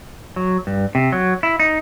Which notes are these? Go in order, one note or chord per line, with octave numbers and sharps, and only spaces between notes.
F#3
G2
C3
F#3
E4
D#4